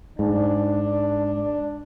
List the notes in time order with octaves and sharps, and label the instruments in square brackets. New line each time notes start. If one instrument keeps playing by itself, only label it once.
[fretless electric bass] G#2 [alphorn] D4